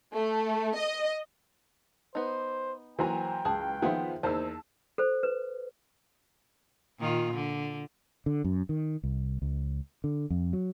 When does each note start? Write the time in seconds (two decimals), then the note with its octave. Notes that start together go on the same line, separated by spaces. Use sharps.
0.14 A3
0.76 D#5
2.15 B3 D#4 C5
2.99 E3 F#3 A#3 C5 G5 G#5 A#5
3.45 C#2 G#4 A5
3.82 D#3 F3 B3 G#4 C5 E5 F5
4.23 E2 A#3 D#4 C5 A5 E6
4.98 A4 C5
5.23 B4
6.99 A#2 D#3 F4
7.34 D3
8.26 D3
8.44 F#2
8.69 D#3
9.03 C2
9.42 C#2
10.04 D3
10.30 F2
10.53 F#3